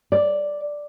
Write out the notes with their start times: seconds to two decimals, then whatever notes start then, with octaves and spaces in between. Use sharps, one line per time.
0.12 D5